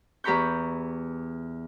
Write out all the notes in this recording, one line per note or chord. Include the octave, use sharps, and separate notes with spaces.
E2 G4 A#5 B5 C#6 G6